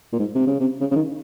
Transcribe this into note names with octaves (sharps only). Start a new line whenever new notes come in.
A#2
G#2
C3
C#3
C3
C#3
C#3
D#3